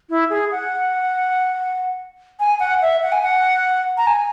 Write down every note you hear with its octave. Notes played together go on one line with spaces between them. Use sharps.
E4
G#4
F#5
G#5
F#5
E5
F#5
G#5
F#5
A#5
G#5